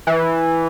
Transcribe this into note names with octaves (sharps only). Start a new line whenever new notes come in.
E3